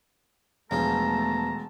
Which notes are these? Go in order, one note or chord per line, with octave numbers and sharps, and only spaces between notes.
E1 E2 F3 A3 A5 A#5